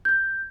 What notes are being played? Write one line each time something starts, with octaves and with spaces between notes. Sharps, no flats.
G6